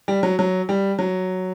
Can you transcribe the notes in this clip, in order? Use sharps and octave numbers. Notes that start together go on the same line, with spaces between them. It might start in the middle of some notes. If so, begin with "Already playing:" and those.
G3
F#3
F#3
G3
F#3